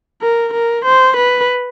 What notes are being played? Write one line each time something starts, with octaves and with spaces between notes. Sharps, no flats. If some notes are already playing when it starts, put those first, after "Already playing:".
A#4
A#4
C5
B4